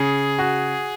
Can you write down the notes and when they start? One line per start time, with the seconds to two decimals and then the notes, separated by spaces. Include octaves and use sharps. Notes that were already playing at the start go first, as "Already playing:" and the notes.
Already playing: C#3 G#4
0.39 F#4